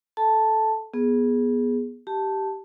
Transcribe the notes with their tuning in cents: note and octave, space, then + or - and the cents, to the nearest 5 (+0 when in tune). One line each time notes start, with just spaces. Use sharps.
A4 -10 A5 +0
B3 -20 G#4 +0
G4 -10 A5 +0